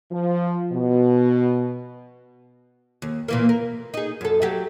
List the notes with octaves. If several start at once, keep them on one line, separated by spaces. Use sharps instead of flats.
F3
B2
D#2
A#2 E3 A#3
A#4
D#4 G#4
F#2 A4
F#3 A3 G4